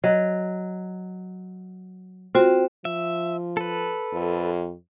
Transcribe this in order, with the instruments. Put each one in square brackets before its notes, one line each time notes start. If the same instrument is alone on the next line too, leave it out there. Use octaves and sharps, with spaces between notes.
[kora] F#3 [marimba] D#5
[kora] C4 [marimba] F4 F#4
[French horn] F3 [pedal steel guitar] E5
[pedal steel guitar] A4 B4
[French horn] F2